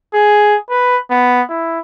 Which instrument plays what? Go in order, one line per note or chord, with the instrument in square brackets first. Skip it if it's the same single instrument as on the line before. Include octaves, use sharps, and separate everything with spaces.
[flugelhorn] G#4
B4
B3
E4